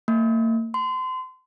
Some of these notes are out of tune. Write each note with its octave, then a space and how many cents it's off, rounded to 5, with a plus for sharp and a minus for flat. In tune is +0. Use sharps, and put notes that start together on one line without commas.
A#3 -45
C6 -30